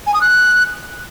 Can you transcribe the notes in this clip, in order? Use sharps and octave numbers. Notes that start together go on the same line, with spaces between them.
G#5
D#6
F#6